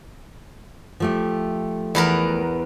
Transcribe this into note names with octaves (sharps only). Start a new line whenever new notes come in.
F3 A3 G4
E2 B3 A#4